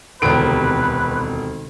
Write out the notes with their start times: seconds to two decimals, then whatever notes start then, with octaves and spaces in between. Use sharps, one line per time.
0.22 E1 D2 C3 D#3 B4 D7